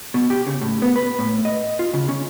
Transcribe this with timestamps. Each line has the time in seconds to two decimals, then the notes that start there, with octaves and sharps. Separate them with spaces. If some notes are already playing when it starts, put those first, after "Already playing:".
0.14 B2
0.30 G4
0.47 C#3
0.62 A2
0.82 B3
0.96 B4
1.19 A2
1.45 D#5
1.79 F4
1.94 C#3
2.09 C#4